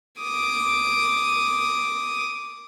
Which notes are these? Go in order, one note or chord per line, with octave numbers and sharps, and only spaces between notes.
D6 D#6